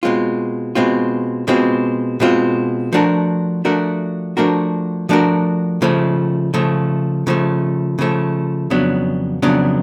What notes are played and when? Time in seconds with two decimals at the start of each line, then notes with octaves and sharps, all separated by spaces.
0.03 B2 G#3 C4 F4
0.75 B2 G#3 C4 F4
1.48 B2 G#3 C4 F4
2.20 B2 G#3 C4 F4
2.92 F3 A3 D4 F#4 A#4
3.65 F3 A3 D4 F#4 A#4
4.37 F3 A3 D4 F#4 A#4
5.09 F3 A3 D4 F#4 A#4
5.82 C#3 F3 A3
6.54 C#3 F3 A3
7.27 C#3 F3 A3
7.99 C#3 F3 A3
8.70 F2 C#3 F#3 B3 D4
9.42 F2 C#3 F#3 B3 D4